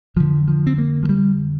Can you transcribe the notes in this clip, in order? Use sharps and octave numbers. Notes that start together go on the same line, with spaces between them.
F2 D3 F3
F3
C4
A#3
F3
G3